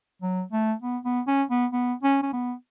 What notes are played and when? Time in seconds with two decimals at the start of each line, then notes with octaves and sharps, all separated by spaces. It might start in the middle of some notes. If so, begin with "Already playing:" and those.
0.22 F#3
0.52 A3
0.82 B3
1.05 B3
1.27 C#4
1.51 B3
1.73 B3
2.03 C#4
2.23 C#4
2.33 B3